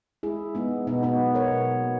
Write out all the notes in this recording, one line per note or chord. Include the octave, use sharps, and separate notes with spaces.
G#3 E4 G#4
G#3 B3 D#4
B2 B3 D#4
B3 D#4
F#3
A#4 C#5
B2
A#3